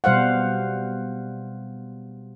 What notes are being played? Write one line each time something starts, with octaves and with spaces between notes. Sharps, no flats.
B2 G3 C5 F5 F#5